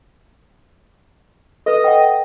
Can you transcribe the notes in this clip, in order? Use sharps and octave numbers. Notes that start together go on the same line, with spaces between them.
A4 B4 D#5
F#5 G5